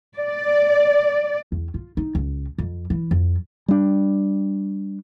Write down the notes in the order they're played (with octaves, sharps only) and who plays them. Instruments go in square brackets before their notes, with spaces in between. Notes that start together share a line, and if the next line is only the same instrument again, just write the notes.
[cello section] D5
[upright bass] E2
F4
D#4
C#2
F2
E3
F2
[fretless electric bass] G3 D4